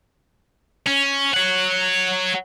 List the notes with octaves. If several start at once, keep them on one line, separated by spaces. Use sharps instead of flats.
C#4
C#5 F#5